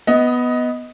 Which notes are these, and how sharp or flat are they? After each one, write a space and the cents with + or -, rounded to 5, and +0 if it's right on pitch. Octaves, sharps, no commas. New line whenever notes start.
B3 +0 D#5 +15